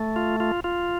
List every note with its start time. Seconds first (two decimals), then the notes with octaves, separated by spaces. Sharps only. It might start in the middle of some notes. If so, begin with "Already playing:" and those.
Already playing: A3
0.16 F4
0.40 F4
0.64 F4